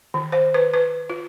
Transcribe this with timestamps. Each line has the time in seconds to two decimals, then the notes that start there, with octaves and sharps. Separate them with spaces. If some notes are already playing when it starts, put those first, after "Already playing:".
0.14 D#3
0.32 C5
0.54 B4
0.74 B4
1.10 F4